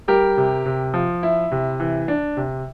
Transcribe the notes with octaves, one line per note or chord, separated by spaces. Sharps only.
G3 G4 A#4
C3
C3
F3
E4
C3
E3
D4
C3